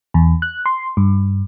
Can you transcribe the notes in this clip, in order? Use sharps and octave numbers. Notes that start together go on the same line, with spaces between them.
E2
F#6
C6
G2